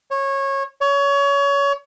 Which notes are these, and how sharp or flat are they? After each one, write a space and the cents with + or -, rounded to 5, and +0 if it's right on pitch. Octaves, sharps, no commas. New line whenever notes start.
C#5 -20
C#5 +25